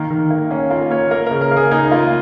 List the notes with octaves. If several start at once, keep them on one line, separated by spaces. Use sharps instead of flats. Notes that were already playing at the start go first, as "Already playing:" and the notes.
Already playing: D#3 A#3
D#3
A#3
A#3 C#4
A#3 F4
A#3 C#5
A#3 A#4
C#3 A#4
A#4
A#3
G#4
A#3 D#4
A#3 F4